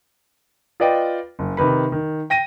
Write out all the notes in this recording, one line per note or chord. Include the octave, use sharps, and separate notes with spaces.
F4 B4 D5 D#5 G5
F#1
C3 D#3 B4 B5
D#3
G5 A#6 D#7